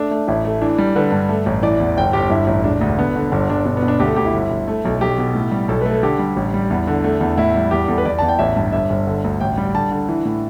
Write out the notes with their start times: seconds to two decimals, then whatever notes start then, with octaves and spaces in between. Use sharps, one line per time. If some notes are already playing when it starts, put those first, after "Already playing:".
Already playing: A3 D4
0.11 A3
0.27 A1 E4
0.45 A3
0.62 E3 D4
0.78 G3
0.96 D3 B4
1.12 G2
1.29 A3
1.46 A1
1.63 E3 D5
1.80 E2
1.97 G1 G5
2.13 G1 G4
2.30 G2 E4
2.47 A1
2.64 E1 D4
2.81 D2
2.98 D3 B3
3.16 D3
3.32 G1 D4
3.50 G1 D4
3.65 B2 D4
3.77 B3
3.82 B2
3.88 D4
4.00 D2 G4
4.08 A4
4.16 D2 G4
4.25 E4
4.34 G1
4.51 G1
4.68 A3
4.85 B1
5.01 B1 G4
5.18 B2
5.35 A2
5.51 G3
5.68 B1 A4
5.81 A3 B4
5.92 A4
6.03 D3 G4
6.19 G3
6.36 A1
6.54 G3
6.70 E2
6.87 D3
7.04 A3
7.21 E2
7.37 A2 E4
7.55 G3
7.71 E2 G4
7.88 E2 A4
7.98 B4
8.05 E2 D5
8.19 E2 A5
8.28 G5
8.39 A1 E5
8.57 G2
8.73 G1 E5
8.90 G1
9.07 D3
9.24 D2
9.41 A1 G5
9.58 G3
9.75 D3 A5
9.91 D3
10.09 E3
10.25 A2